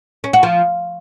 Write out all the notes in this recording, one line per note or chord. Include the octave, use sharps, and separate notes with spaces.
C#4
F#4
F3